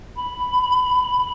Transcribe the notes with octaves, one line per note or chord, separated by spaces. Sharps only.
B5